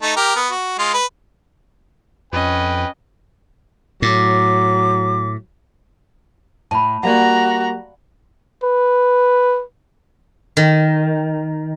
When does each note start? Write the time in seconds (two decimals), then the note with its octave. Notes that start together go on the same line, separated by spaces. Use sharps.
0.02 A3 D#4
0.16 G4 A#4
0.36 B3
0.51 F#4
0.79 G#3 F4
0.94 B4
2.33 F2 C#4 B4 D#5 G5
4.02 A2 F#3 D6
6.71 A2 A5 B5
7.03 G3 A#3 F#4 D5 F5 F#5 A#5
8.64 B4
10.57 D#3